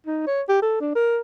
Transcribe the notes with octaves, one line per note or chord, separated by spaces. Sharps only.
D#4
C#5
G4
A4
D4
A#4